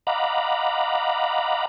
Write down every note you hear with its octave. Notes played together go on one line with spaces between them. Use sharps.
D#5 F5 F#5 A#5 B5 D6